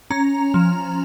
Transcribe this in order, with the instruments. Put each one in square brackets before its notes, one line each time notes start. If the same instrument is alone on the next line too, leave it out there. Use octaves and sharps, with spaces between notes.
[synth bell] C#4 A#5
F3